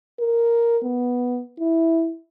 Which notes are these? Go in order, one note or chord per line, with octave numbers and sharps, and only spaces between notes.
A#4
B3
E4